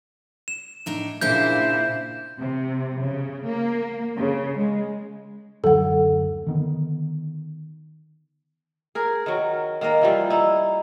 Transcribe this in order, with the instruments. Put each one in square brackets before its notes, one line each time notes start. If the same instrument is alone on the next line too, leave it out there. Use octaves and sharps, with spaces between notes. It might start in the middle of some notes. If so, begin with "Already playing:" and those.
[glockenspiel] E7
[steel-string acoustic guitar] A2 D4 D#4
[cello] A#2 E4 [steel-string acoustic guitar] C#3 D4 C5 [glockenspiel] G6
[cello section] C3
C#3
A#3
C#3
G#3
[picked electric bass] F#1 D2 F#3 [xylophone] A4 F#5
[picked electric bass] D3 D#3 B3
[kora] G#4 A#4
D#3 F#3
D#3 A#3 D#4 D#5
E3 F3 G3
D#4 E4